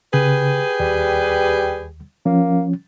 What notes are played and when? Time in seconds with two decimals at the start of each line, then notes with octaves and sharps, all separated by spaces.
0.14 C#3 G4 G#4 B4
0.80 D#2 G3
2.26 F3 A#3 C#4